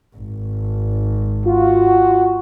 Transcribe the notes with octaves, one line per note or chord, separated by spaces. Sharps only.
G#1
F4 F#4